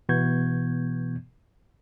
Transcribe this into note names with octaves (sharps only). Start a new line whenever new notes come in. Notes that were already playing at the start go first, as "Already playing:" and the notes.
B2 E3 B3 C#6 G6 G#6